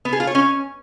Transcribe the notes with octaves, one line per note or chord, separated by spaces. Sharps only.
B3
G#4
F4
C#5
C#4